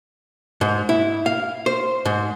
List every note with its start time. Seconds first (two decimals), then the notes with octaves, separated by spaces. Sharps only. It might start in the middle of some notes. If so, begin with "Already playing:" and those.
0.61 G#2
0.89 E4
1.26 F5
1.66 C5
2.05 G#2